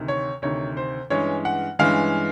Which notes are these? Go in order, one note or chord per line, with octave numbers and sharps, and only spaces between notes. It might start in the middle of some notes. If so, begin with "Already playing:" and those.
Already playing: D2 C3 D#3
C#5
D2 C3 D#3 C#5
C5
G2 E3 G#3 C#4 C#5
F#5
G2 E3 G#3 C#4 F5